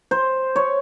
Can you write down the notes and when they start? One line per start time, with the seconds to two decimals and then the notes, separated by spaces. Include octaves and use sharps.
0.11 C5
0.56 C#5